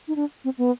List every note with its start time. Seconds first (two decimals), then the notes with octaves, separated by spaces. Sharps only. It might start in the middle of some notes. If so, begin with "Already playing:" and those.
0.08 D#4
0.16 D4
0.44 C4
0.58 B3